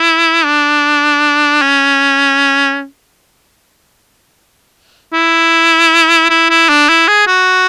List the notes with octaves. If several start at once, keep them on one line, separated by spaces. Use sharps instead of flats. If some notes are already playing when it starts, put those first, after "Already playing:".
Already playing: E4
D4
C#4
E4
E4
E4
D4
E4
G#4
F#4